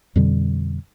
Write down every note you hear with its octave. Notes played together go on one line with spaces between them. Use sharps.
F2 B2 D3 G3